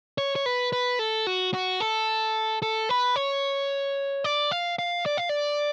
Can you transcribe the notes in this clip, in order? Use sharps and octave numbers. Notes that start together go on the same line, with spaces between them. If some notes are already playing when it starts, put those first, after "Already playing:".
C#5
C#5
B4
B4
A4
F#4
F#4
A4
A4
B4
C#5
D5
F5
F5
D5
F5
D5